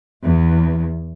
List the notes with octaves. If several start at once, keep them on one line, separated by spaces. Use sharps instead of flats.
E2